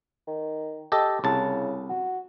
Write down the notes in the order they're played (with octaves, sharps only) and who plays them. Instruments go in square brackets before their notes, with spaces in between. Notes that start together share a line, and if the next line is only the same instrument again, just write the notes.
[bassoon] D#3
[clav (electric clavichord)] G4 A4 D#5
[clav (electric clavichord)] C2 A5 [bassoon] C#3
[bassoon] F#4